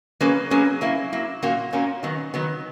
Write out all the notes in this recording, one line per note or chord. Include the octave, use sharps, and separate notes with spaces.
F#3 A#3 C#4 G#4 B4
F#3 A#3 C#4 G#4 B4
F#3 A#3 E4
F#3 A#3 E4
A#2 A#3 C#4 F#4
A#2 A#3 C#4 F#4
D#3 F#3 B3
D#3 F#3 B3